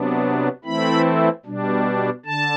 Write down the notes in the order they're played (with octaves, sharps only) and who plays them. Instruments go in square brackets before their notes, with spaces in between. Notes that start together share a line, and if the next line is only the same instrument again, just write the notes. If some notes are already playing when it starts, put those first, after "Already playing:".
Already playing: [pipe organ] C3 F#3 B3 D4
E3 A3 C4 E4 B5
B2 G3 D4
D3 A5